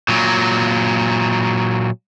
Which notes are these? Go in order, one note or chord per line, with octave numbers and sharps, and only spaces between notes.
A#2 F#3